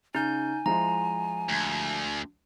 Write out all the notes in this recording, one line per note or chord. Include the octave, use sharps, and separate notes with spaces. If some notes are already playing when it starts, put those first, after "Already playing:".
C#3 D#4 G#5 G6
F3 G#3 E4 A#5
D2